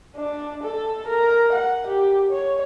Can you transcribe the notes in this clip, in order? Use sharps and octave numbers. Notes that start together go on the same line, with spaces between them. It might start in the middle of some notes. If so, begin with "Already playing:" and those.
D4
A4
A#4
F#5
G4
C#5